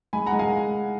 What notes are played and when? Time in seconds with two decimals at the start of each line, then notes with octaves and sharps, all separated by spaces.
0.13 G#3 G#5 B5
0.26 F#5 A#5
0.32 G#3
0.39 F5 G#5